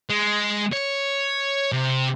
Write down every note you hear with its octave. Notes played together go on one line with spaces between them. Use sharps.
G#3
C#5
C3